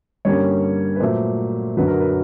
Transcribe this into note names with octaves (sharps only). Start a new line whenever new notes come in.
G2 D3 G3 A#3 C#4 C#5
B4
A#2 F#3 A3 C5
F#2 D3 F#3 B4
A#4
B4